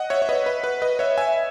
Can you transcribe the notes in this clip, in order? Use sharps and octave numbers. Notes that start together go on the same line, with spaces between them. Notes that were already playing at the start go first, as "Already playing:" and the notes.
Already playing: D#5 F#5
C#5 E5
C#5
B4 D#5
B4
B4
B4 D#5
C#5 E5
E5 G#5